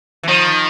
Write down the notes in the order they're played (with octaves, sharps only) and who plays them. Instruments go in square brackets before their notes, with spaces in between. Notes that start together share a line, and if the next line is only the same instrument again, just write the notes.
[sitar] E3
[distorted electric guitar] D#3 [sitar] F3